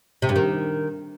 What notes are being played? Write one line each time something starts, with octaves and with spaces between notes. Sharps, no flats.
C3
G2
D#3